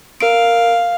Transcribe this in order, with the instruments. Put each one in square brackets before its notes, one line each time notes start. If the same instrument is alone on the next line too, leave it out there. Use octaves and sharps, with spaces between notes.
[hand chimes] A#4 D7 [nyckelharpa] F5